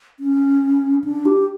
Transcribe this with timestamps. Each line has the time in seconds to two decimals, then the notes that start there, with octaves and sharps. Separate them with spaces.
0.20 C#4
1.04 D4
1.25 G4